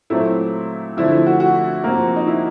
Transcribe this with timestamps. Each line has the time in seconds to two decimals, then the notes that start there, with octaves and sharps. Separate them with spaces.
0.10 A#2 F#3 A3 C4 E4
0.97 D3 F3 A3 C4 E4
1.11 E4
1.27 F#4
1.40 F#4
1.84 C3 F3 A#3
2.16 D#4
2.27 E4